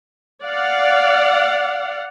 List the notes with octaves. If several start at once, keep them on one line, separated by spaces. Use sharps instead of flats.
D5 F5 F#5